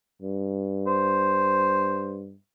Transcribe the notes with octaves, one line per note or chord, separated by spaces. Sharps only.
G2
C5